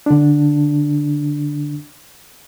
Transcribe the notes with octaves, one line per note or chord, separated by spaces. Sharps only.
D3 D4